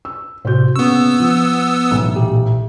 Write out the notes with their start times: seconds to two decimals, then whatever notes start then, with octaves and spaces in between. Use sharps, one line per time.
0.05 E6
0.45 A2 C3 F#4 C5 G6
0.76 C#3 A#3 B3 C#6 E6
1.20 F3
1.91 B1 A2 E3
2.15 A#2 G4 E5